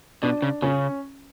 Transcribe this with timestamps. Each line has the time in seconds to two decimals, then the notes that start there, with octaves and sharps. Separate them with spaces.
0.22 B2 D4
0.42 C#3
0.62 C#3 C#4